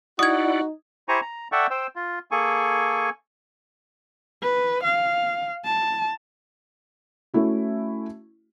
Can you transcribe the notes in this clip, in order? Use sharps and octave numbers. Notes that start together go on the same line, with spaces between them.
D#4 E4 F#4 D5 F#5 D#6 G#6
E4 G4 C5 G#5 A#5 C#6
A#5
A4 D5 E5 F#5 G5 C#6
C5 G5 E6
F4
A#3 G#4 A4 G#5 C#6
B4
F5
A5
A3 C#4 E4 F#4